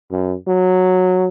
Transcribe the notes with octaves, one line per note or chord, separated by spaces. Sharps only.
F#2
F#3